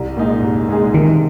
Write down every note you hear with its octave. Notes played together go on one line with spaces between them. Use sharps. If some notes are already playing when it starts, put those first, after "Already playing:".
Already playing: C2
A#2 G#3 D#4 G#4
C2
A#2 G#3 D#4 G#4
C3 D#3